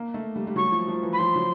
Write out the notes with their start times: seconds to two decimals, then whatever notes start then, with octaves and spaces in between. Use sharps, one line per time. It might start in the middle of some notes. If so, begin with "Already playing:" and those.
Already playing: A#3
0.14 A3
0.36 G3
0.47 G3
0.56 F#3 C#6
0.72 F3
0.88 F3
1.03 E3
1.13 B5
1.19 F3 C6
1.36 F#3